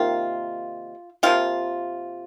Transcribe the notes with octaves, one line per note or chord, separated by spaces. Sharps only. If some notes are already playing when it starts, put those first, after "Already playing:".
Already playing: C3 D#3 A#3 F4
C3 F3 A#3 F4